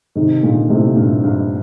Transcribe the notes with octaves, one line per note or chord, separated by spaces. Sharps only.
C3 D#3
A#2 D3
A2 C3
G2 A#2
G2